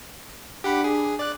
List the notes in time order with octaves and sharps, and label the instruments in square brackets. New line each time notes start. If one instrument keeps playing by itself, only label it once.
[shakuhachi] D4 [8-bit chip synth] G4 F#5 B5
[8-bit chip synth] G#4
D5 F#6